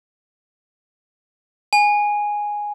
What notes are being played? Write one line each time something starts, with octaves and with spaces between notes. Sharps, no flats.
G#5